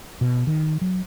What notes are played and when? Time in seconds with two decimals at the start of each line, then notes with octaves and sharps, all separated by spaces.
0.21 B2
0.47 D#3
0.81 F#3